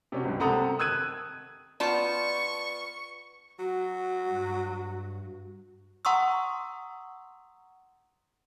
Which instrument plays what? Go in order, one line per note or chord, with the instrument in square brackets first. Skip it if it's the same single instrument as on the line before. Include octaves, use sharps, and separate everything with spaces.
[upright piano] C3 C#4 F#4
C#2 G2
C3 A4 F#5 A#5 D#6
D#6 E6 F#6 G#6 D#7
[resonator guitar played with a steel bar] B3 F4 A5 [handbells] D5 C6 [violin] C#6
[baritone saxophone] F#3 [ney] F#4
[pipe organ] G2
[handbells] F#5 A#5 C6 C#6 D#6 E6